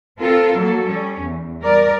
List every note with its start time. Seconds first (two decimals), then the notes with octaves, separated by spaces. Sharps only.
0.20 C4 F4 A4 A#4
0.58 F#3 A#3 A4
0.86 G3 C#4
1.20 E2
1.61 G3 A#4 D5